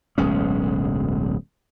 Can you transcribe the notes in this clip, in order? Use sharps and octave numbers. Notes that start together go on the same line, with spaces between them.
D1 B1 G#3 C#4